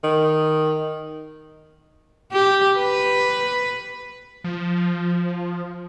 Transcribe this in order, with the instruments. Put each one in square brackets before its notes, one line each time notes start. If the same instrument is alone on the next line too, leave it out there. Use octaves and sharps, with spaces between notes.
[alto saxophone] D#3
[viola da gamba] G4
B4
[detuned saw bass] F3